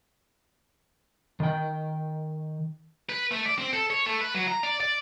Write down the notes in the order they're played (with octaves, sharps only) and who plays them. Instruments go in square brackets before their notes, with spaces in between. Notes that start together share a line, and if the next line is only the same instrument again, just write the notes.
[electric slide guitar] D#3 G5
[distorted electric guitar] B4
A3
D5
C4
A4
C#5
A3
B4
F#3
A#5
D5
D5